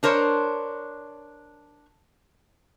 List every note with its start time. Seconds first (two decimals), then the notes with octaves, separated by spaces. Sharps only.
0.03 D4 A#4 C5 C#5